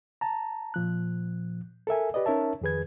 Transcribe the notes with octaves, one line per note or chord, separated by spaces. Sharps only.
A5 A#5
A#2 F3 F#6
A4 A#4 E5 G#5
G4 B4 D5 D#5
C#4 D#4 A#4 C#5 E5 A5
F2 D#3 G#4 B4 G#6